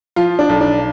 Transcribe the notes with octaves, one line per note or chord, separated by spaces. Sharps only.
F3 F4
D4
B1
D4